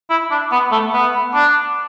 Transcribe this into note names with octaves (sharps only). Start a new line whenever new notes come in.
E4
D4
B3
A3
B3
D4